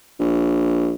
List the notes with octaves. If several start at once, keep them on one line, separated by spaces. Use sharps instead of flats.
A#1